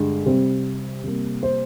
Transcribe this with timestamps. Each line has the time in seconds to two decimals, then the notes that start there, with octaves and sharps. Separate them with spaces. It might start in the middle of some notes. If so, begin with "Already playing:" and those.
Already playing: G2 D3 G#3
0.26 C3 G3 C4
1.04 C3 G3 A#3
1.43 C5